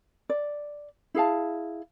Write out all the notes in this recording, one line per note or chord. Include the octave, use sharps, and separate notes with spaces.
D5
E4 G#4 F5 A5